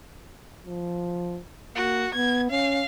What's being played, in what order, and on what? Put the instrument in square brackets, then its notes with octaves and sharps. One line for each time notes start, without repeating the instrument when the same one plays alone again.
[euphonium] F3
[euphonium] A#3 [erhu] F#4
[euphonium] B3 [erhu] G#6
[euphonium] C#4 [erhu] F5